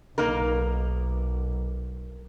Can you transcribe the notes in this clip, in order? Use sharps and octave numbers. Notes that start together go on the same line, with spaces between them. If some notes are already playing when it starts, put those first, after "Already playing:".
B1 A#3 D#4 A#4